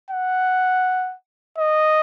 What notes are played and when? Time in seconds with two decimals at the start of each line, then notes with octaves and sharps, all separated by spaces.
0.11 F#5
1.58 D#5